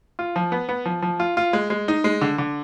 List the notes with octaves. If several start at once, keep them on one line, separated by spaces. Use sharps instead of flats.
F4
F3
B3
B3
F3
F3
F4
F4
G#3
G#3
D#4
G#3
D3
D3